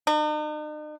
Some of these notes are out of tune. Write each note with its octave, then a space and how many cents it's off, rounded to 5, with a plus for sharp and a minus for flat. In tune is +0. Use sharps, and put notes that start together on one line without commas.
D#4 -45